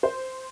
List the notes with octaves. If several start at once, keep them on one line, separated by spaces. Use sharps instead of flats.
C5